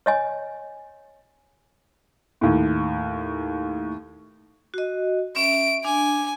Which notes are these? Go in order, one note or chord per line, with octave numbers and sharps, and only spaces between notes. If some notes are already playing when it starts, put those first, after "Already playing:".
C#5 D#5 G#5
D#2 A2
F#4 D#5
C#4 E5 D7
D4 G#5